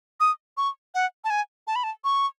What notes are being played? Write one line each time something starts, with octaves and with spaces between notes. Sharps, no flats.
D#6
C#6
F#5
A5
G#5
A5
B5
A5
C#6